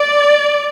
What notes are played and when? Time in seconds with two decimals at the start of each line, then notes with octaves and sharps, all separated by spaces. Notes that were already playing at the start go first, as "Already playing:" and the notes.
Already playing: D5